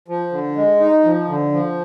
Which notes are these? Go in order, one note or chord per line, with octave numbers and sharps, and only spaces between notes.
F3
D3
G#3
D#4
F3
D3
F3